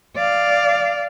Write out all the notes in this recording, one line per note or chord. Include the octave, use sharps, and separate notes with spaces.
D5 F5